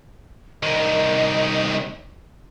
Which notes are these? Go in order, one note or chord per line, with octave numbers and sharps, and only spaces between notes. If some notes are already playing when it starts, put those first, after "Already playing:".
C2 D#3 D#5